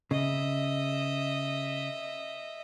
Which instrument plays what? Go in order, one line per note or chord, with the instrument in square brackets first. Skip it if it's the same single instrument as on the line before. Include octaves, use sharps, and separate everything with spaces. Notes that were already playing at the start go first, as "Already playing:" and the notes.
[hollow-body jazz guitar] C#3 [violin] D#5 E5